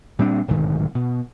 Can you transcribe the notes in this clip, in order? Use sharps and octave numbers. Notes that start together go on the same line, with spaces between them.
A#2 G3 C4 D4
D1 B1 G#2 D#3
B2